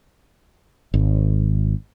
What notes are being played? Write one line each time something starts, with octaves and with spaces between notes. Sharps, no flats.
G#1